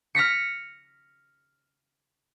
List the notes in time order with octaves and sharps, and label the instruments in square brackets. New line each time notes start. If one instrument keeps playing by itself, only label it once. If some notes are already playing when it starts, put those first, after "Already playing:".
[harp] F6 A#6 B6 C#7